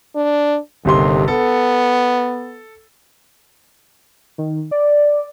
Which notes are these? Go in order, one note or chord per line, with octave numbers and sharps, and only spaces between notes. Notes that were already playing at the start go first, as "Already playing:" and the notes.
D4
G1 D#2 C3 C6
B3 A4
D#3
D5